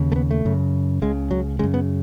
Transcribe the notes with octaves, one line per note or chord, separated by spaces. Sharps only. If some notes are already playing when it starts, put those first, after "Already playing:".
Already playing: D#2 C#3
A3
B3
A3
F#2 C#3
C#2 C#3 G#3
F#3
F#2 C#3 G#3
B3